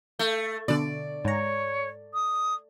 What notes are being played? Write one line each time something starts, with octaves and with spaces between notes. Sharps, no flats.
A3 G6
B2 D3 D5
G#2 C#5 A#5
D#6